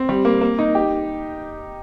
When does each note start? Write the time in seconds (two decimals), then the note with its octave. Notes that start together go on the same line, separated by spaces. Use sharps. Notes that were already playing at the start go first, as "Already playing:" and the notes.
Already playing: C4
0.09 G3
0.25 A#3
0.41 A#3
0.59 D#4
0.75 G4